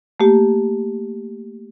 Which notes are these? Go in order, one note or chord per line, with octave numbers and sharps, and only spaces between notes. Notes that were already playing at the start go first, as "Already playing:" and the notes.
A3 A#3 G4